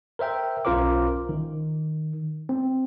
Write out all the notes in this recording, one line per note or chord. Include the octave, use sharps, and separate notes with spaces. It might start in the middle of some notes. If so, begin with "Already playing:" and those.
A#4 C5 E5 G5
B1 C#4 F4 A#4 C5 D6
D#3
C4